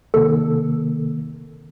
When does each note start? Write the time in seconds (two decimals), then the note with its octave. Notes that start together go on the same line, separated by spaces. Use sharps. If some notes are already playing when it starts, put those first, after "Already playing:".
0.14 C3 D#3 A#3 A4